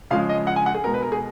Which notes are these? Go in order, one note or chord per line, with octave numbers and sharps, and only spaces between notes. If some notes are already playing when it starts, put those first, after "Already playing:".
C#3 F3 G#3 F5
D#5
F#5
G#5
F#5
G#4
B2 G#3 A#4
B4
A#4
G#4